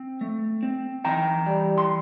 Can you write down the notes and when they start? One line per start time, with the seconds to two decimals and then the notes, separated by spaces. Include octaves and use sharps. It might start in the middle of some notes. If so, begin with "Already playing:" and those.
Already playing: C4
0.21 A3
0.63 C4
1.05 E3 G5 A#5
1.47 G3
1.78 C6